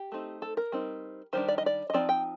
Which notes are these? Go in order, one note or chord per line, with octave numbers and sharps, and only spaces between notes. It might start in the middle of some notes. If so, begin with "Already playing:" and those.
Already playing: G4
A3 C4 D#4
A4
A#4
G3 C4 D#4
D#3 G3 D4 C5
D5
D#5
D5
D#5
F3 C4 D#4 D5
G5